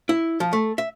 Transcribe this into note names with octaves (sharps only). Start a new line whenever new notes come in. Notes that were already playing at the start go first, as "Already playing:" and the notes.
E4
F3
A3
E5